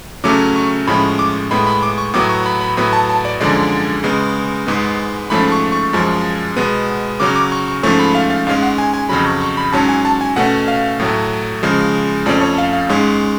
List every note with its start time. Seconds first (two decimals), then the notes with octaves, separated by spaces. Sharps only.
0.24 C#3 F#3 A3 C#4 D6
0.56 C#6
0.87 A2 F3 G#3 C#4 B5
1.19 D6
1.51 A2 G#3 B3 B5
1.67 B5
1.83 D6
1.98 C#6
2.14 A2 F#3 B3 D6
2.29 C#6
2.46 B5
2.61 B5
2.77 A2 F#3 B3 B5
2.93 A5
3.09 A5
3.25 D5
3.40 F#2 D3 F3 G#3 D5
4.04 C#3 G#3 B3
4.66 G#2 G#3 B3
5.30 G#2 F3 A3 C#4 B5
5.52 C#6
5.72 C#6
5.93 F#2 F3 G#3
6.57 B2 G#3 B3
7.20 C#3 F#3 C#4 D6
7.36 D6
7.52 C#6
7.68 C#6
7.83 G#2 F3 A3 C#4 C#6
7.99 B5
8.15 F5
8.30 F5
8.47 G#2 G#3 C#4 F5
8.63 F#5
8.78 G#5
8.94 G#5
9.09 F2 C#3 F#3 B5
9.26 C#6
9.41 C#6
9.57 B5
9.73 G#2 F#3 C#4 A5
9.89 G#5
10.05 A5
10.21 G#5
10.36 B2 A3 C#4 F#5
10.68 F5
11.00 A2 F#3 A3
11.63 C#3 F3 G#3
12.26 F2 F3 A3 C#4 D5
12.41 C#5
12.58 F5
12.73 F5
12.89 G#2 G#3 C#4